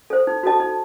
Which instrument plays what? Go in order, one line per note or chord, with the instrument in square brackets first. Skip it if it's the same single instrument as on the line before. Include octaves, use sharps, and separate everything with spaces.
[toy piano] A4 C5
D#4
F#4 A4 D#5 A5
D#4